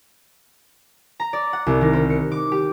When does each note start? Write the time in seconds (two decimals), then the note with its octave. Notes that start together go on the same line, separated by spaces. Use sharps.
1.20 A#5
1.33 D5
1.53 F#5
1.66 C2
1.81 D#3
1.93 C4
2.10 C#7
2.32 D6
2.52 G4